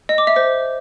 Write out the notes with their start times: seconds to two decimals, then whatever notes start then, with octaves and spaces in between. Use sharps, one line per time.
0.09 D#5
0.18 D6
0.27 E5
0.36 C5